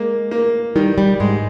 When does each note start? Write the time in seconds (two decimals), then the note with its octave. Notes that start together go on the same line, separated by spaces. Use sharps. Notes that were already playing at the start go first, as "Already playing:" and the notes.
Already playing: G#3 A#3
0.31 A#3
0.76 D#3 G3
0.98 G3
1.20 G#2 G#3